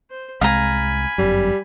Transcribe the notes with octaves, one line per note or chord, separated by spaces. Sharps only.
C5
C2 G#3 F5 G#5 A#5 B5
G1 F#2 G3